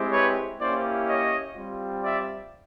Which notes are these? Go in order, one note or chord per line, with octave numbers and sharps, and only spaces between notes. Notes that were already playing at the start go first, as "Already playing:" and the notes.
Already playing: G#3 C4 E4 G4
B4 C#5
A#3 C#4 E4 G4 C5 D5
C#5 D#5
G3 C4 F4
D5 E5